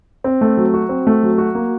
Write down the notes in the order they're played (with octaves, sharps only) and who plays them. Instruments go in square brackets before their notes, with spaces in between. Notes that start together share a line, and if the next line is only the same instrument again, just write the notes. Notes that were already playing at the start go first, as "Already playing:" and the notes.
[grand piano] C4
A3
F#3
F#4
C4
A3
F#3
F#4
A#3